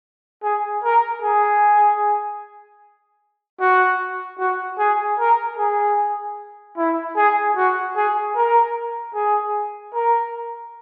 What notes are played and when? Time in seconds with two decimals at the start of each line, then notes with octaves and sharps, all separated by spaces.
0.43 G#4
0.84 A#4
1.22 G#4
3.60 F#4
4.39 F#4
4.79 G#4
5.19 A#4
5.57 G#4
6.77 E4
7.16 G#4
7.56 F#4
7.96 G#4
8.35 A#4
9.14 G#4
9.94 A#4